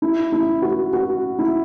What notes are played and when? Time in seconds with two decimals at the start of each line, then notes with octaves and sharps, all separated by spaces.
0.02 E4
0.32 E4
0.62 F#4
0.93 F#4
1.39 E4